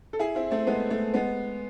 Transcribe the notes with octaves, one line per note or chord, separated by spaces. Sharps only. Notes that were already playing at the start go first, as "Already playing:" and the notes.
A4
E4 G#4
C4 E4
A3 C4
G#3 B3
A3
G#3 B3